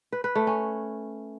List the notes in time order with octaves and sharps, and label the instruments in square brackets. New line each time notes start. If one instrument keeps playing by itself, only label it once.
[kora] B4
B4
A3
C#4